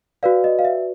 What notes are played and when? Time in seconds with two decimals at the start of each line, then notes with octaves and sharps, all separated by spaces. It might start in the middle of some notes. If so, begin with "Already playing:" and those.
0.23 F#4 B4 D5 F5
0.44 D#5
0.59 F5
0.65 E5